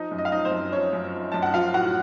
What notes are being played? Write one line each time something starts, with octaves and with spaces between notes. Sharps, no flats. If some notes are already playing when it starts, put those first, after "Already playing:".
Already playing: F3 D#4 D#5
F#2
D#5
F5
F3 D#4 D#5
C4 C5
F#2
F3 C#4 C#5
F#2
F3
F#2 A5
F#5
F3 F4 F5
A2 F#4 F#5